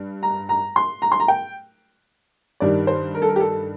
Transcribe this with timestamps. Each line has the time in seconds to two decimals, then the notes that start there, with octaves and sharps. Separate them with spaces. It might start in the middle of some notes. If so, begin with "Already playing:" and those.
Already playing: G2
0.23 A#5
0.49 A#5
0.76 C6
1.02 A#5
1.12 C6
1.20 A#5
1.28 G5
2.60 G2 D#3 G3 D5
2.87 C5
3.14 A#4
3.22 A4
3.29 A#4
3.36 G4
3.40 A4